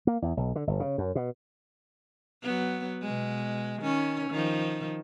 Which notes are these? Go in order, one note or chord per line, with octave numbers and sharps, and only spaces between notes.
A#3
E2
B1
D3
G1
C#3
F#2
B2
F#3 B3
B2 G#3
D#3 C#4
D#3 F3